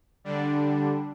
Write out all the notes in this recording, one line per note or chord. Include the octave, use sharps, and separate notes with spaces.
D3 G3 D4